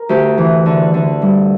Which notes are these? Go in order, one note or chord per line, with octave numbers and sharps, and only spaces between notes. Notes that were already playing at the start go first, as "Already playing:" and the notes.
Already playing: A#4
D2 G4
E3
D3
D3
G2